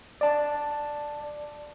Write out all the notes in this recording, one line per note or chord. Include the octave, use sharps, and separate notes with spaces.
D5 A5